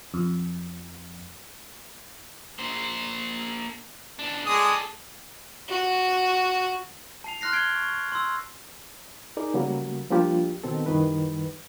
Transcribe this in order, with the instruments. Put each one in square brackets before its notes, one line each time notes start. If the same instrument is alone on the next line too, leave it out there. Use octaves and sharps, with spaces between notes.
[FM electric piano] F2
[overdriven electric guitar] A#3 C5
B2 D4
[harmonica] G#3 D5 D#6 [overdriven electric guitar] G#4 A4
[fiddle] F#4
[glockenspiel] A5 C7 F7
C6 F6 F#6 A#6 C7
G#6 C7 D7 G7
C#6
C6 E6
[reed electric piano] D#4 G#4 A#4 D5
C#3 F#3 G3 A3 A#3 F#4
F3 G3 A#3 D4 F4 G4
B2 D#3 C4 D#4 A4
C2 F#2 D#3 E3 G3 B4